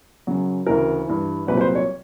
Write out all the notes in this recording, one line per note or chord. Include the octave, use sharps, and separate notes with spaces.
F#2 C#3 F#3
D2 C#3 E3 A#4
G2 E3
C2 A#2 F#3 B4
B4
C5
C#5